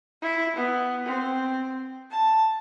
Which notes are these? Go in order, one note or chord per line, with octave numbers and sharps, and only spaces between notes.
E4
B3
C4
A5